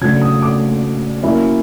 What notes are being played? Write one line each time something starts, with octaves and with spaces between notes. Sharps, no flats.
C#3 F#3 A3 D4 G#6
D#6
D6
F#3 A#3 C#4 E4